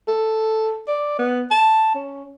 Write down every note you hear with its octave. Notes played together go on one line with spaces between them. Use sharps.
A4
D5
B3
A5
C#4